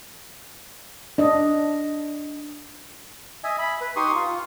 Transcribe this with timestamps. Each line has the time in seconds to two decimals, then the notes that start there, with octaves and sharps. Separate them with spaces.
1.18 D4 D#5
3.44 D#5 E5 G#5
3.59 B5
3.81 B4
3.96 D#4 G4 C6 C#6 D#6
4.15 F4